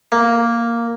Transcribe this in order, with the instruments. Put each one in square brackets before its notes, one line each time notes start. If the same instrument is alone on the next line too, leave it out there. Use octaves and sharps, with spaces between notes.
[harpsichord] A#3